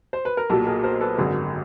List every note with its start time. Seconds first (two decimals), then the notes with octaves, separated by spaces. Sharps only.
0.13 C5
0.25 B4
0.37 A#4
0.50 B1 A#2 F#3 G4 A4
0.67 G#4 A#4
0.84 A#4 C5
1.01 A4 B4
1.18 G#1 F#2 D3 G3 G#4 A#4